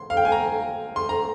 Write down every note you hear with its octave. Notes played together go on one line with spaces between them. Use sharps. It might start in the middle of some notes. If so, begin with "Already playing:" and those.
Already playing: C6
F5
G5
G#5
A#5
C6
A#5